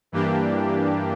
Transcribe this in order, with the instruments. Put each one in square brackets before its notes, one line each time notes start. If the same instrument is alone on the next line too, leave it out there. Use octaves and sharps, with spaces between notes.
[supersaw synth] G2 E3 A#3 D4 G4